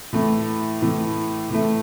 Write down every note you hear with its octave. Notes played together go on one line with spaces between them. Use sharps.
A2 E3 A3
A2 E3 A3
A2 E3 A3